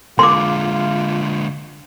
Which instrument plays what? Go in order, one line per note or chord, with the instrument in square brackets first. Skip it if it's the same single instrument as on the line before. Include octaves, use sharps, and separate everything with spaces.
[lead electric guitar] D3 G#3 [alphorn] F4 [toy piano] C6 D6